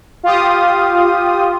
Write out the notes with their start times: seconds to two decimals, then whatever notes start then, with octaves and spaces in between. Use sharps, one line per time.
0.23 F4 G4 D#6